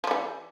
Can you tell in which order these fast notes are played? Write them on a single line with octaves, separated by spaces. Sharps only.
F3 G3 E3